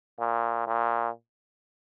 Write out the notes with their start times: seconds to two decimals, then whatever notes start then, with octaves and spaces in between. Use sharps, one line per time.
0.20 A#2
0.67 A#2